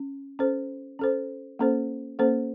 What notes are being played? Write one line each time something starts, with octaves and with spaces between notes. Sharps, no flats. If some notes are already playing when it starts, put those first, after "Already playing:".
Already playing: C#4
C#4 A4 C5
C#4 A4 C5
A#3 C#4 A4 C5
A#3 C#4 A4 C5